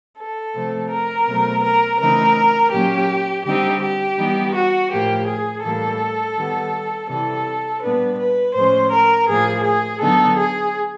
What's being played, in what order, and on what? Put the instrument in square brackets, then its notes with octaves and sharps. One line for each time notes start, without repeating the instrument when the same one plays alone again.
[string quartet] A4
C3 F3 A3 C4
A#4
B2 F#3 A3 C4
A#4
C#3 E3 A3 C4 D#4 A#4
A#2 F#3 A#3 C#4 G4
D3 G3 C4 D#4 G4
G4
E3 G3 B3 D#4
F#4
A2 F3 A#3 G4
G#4
A2 E3 G3 A#3 A4
D#3 G3 B3
C3 E3 G3 A4
A#2 G3 B3 D4 B4
B4
A2 F3 G#3 C#4 C5
A#4
A2 F3 A#3 G#4
G#4
D3 F#3 B3 D#4 A4
G#4